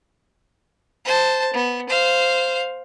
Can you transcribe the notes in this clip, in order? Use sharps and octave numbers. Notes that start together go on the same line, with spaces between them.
C5 A5
B3
C5 F5